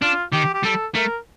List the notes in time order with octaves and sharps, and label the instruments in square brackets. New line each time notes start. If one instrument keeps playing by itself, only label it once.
[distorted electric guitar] D4 [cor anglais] F4
[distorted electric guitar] D#3 [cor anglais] G4
[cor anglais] G4
[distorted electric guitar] G3 [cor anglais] A4
[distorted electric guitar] A3 [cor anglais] A#4